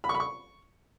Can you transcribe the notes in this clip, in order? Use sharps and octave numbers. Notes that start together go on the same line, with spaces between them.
B5
C#6
B5
C#6